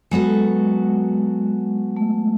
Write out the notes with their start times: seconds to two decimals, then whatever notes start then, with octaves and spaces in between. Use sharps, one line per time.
0.11 F#3 G#3 B3 F#4 A4
1.97 A3